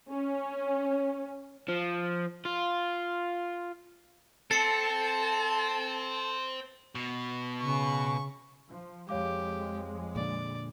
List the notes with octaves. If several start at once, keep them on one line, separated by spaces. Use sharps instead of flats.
C#4
F3
F4
C4 A4 A5 A6 C7 C#7
B2
C#3 C#6
F3
F2 G#3 G4 C#5 F5 D6
A#2 D3 D5